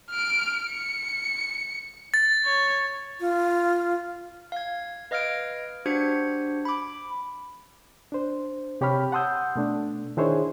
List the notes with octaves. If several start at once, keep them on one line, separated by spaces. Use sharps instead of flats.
F6 D7
C#7
A6
C#5
F4
F5 G#6
B4 D#5 F5 F6 G#6 D7
D4 F#4 G4 C5 G#6 C#7
B5 D6
D4 C5
C3 G4 C#5 G5 B5 F6
F#5 A5 C6 D#6 E6 G6
B2 A3 D4
D#3 D4 E4 G#4 C5 C#5